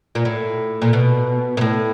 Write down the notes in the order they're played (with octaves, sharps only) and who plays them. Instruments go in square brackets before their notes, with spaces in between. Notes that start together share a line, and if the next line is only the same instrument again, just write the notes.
[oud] A#2
A2
A#2
B2
A#2
A2